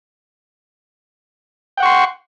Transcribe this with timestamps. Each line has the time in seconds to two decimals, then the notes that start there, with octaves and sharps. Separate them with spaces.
1.78 G5
1.80 F#5
1.83 C#6
1.85 C6